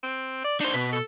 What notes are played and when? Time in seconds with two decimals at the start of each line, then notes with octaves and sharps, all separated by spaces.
0.03 C4
0.44 D5
0.60 D4 D#4 C5
0.74 B2 B4
0.93 A4